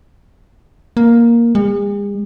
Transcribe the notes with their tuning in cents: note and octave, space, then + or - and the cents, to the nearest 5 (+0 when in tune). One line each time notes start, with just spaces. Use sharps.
A#3 +5
G#3 -45